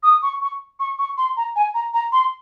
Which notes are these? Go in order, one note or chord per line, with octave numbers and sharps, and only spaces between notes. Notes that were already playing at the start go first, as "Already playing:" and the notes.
D#6
C#6
C#6
C#6
C#6
C6
A#5
G#5
A#5
A#5
C6